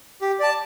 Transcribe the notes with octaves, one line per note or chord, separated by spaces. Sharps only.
G4
D5 A5